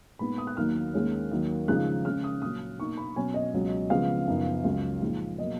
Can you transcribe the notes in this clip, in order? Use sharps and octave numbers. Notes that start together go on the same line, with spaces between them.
A#2 G#3 B3 D#4 B5
D#6
F#6
D#2 D#3 F#3 A#3 D#4 F6
D#2 D#3 G#3 C#4
D#2 D#3 F#3
C#3 F3 G#3 D#4 F#6
C#3 G#3 C#4 F6
D#6
A#2 F#3 C#4 D#6
B2 A#3 D#4 C#6
B5
B2 F#3 C#4 G#5
D#5
C#2 B2 F#3
C#3 F3 G#3 B3 F5
F#2 C#3 F3 B3 D#4
C#2 C#3 F#3
A#2 F3 G#3 D#4
B2 F#3 A#3 D#5